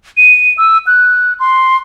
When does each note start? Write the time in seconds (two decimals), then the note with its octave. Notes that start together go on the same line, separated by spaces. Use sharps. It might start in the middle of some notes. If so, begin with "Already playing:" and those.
0.17 D#7
0.58 E6
0.87 F#6
1.40 C6